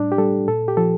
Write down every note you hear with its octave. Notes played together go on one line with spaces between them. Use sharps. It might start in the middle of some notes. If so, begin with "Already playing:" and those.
Already playing: A2 G3 D4
G4
G3 A4
A#2 A4
G4
F3 A4